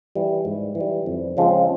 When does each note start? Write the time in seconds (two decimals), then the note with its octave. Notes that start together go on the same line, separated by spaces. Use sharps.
0.15 E3 G3
0.45 G#2
0.75 E3
0.81 G3
1.06 F2
1.37 C#3 F3 G#3 C4